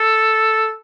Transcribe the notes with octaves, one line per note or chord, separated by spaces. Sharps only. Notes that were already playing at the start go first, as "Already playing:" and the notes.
Already playing: A4